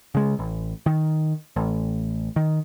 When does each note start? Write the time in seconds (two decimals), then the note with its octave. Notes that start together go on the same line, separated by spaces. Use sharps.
0.15 C#3 G#3
0.39 A1
0.86 D#3
1.56 A1
2.36 D#3